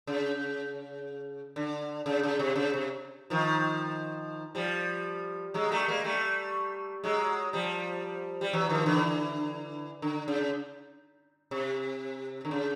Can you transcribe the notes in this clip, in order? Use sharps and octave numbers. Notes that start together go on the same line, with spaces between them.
C#3
D3
C#3
C#3
C3
C#3
C3
D#3 F3
F3 G3
F#3 G#3
G3 A3
G#3 A#3
G3 A3
F#3 G#3
F3 G3
G3
E3 F#3
D#3 F3
D3 E3
D3
C#3
C3
D3
C#3